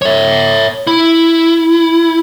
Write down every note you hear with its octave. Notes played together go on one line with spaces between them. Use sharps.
C#5 E5
E4